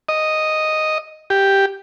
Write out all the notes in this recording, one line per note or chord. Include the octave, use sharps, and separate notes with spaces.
D#5
G4